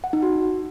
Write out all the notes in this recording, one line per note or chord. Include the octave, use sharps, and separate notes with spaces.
F#5
D#4
F#4